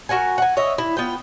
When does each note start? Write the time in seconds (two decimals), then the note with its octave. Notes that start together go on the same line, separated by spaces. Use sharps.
0.09 F#4 A#4 F#5 G#5
0.38 F#5 G#5
0.57 C#5 D#5 E5
0.78 E4
0.97 B3 F4 G5